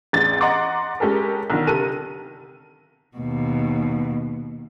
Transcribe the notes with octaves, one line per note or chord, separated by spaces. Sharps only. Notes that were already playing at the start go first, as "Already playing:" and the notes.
A1 E2 A6
D#5 F#5 A#5 C6 D6
G#3 C#4 G4 A4 A#4
B1 D3 D#3
C3 A4 A#4 D#7
D#2 B2